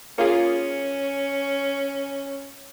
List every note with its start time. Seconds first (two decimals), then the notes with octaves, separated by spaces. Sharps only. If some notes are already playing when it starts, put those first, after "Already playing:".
0.18 A#3 C#4 F4 G#4